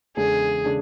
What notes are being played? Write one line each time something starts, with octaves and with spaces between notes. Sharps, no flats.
E2 C#3 G#3 D4 G#4 A4
C#3 G#3 D4 A4